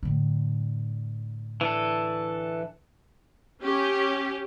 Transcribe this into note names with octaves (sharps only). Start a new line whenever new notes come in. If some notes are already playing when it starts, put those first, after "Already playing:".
A2 D3
E3 D4 A4
C#4 G4